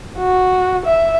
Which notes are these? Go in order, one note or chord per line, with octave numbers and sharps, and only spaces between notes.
F#4
E5